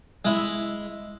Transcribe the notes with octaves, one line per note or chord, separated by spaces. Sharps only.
G#3 E4 E5